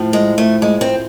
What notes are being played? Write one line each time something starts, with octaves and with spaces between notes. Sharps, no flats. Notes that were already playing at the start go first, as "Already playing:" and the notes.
Already playing: A2 F3
G#3
A3
G#3
C4